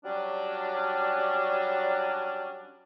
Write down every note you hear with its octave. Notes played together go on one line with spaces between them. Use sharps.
F#3 G3 C#4 D4